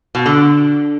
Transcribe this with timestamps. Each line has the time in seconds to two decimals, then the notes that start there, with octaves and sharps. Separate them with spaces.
0.15 B2
0.26 D3